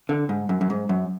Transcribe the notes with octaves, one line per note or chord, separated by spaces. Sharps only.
D3
G#2
F#2
F#2
G#2
F#2